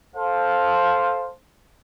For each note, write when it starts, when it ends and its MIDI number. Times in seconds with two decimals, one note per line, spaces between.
0.15 1.29 69
0.15 1.29 72
0.15 1.29 77